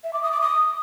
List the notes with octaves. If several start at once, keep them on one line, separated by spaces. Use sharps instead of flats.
E5
D6
D#6
D6
D#6